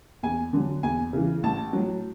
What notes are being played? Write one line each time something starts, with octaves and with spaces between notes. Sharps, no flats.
E2 G#5
D3 F#3
E2 G#5
C#3 E3
A1 A5
A2 F#3